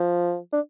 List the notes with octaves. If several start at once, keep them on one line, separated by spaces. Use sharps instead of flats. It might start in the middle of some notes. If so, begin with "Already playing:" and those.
Already playing: F3
D4